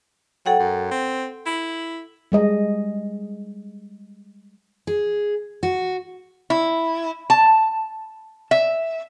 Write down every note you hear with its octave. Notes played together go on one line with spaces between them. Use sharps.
F#3 A4 F#5 G5
F#2
C4
E4
G3 G#3 D#5
G#4
F#4
E4
A5
E5